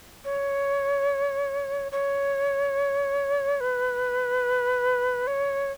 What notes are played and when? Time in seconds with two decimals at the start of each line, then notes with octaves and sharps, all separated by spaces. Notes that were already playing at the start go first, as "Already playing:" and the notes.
0.25 C#5
1.92 C#5
3.60 B4
5.27 C#5